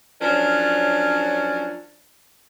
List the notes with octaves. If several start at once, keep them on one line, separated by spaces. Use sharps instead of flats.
F3 F#3 C#4 D4 A#4